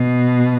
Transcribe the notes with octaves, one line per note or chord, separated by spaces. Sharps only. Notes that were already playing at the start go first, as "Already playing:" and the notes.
Already playing: B2